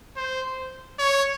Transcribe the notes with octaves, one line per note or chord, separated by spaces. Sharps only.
C5
C#5